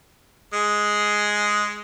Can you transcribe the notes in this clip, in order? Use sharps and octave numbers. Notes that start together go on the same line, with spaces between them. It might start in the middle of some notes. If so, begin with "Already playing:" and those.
G#3 G#4